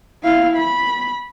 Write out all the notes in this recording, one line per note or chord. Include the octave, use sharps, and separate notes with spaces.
E4 F5
B5